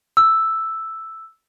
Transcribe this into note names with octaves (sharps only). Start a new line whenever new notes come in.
E6